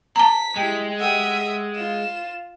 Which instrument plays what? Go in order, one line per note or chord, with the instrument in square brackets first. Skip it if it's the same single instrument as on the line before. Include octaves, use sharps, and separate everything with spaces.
[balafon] A5 A#5 [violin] B6
[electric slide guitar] G#3 [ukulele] E4 G4
[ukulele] G4 A4 F#5 [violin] E5 D#6
[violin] F4 E7